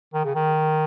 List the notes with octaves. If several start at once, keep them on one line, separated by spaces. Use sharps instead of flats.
D#3
C#3
D#3